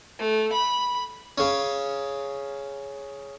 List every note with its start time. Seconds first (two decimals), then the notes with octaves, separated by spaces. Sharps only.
0.19 A3
0.52 B5
1.38 C#3 C#4